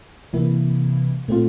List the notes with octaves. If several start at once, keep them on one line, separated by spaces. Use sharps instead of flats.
C3 E3 A#3 E4
A#2 A3 C4 F4